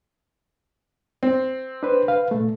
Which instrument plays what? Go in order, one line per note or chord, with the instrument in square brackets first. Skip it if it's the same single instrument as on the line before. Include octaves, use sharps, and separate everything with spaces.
[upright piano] C4
[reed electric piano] D4 B4 C5
B4 F5
A#2 A3